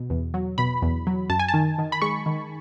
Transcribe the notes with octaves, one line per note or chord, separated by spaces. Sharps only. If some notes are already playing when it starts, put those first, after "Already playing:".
Already playing: B2
E2
F#3
B2 B5
E2
F#3
F#2 A5
G#5
A5
D#3
D#3
B5
G#3 C#6
D#3